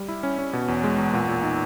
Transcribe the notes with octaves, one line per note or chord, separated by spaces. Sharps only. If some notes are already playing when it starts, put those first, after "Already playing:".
Already playing: G3
E4
C#4
C#4
B2
E2
G#3
E2
A#2
A#2
D#4